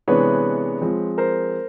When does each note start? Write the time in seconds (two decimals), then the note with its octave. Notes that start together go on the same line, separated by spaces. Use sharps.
0.08 C3 E3 G#3 B3 D4 B4 C#5
0.81 F3 G#3 C4
1.18 A#4 C5